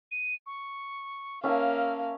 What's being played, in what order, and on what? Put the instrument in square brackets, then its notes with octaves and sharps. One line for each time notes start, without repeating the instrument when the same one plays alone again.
[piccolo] D#7
C#6
[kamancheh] A#3 F5 [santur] C#4 E5 A5 [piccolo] F6